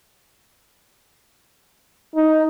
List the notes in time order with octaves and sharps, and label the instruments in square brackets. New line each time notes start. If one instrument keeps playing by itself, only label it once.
[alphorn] D#4